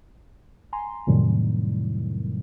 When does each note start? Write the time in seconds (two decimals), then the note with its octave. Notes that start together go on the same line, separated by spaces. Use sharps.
0.73 G#5 A#5 C6
1.07 F2 A2 C3 D#3 F#3 G3